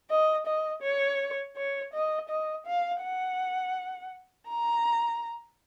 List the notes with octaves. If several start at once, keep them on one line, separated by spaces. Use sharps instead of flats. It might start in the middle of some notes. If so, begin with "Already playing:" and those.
D#5
D#5
C#5
C#5
D#5
D#5
F5
F#5
A#5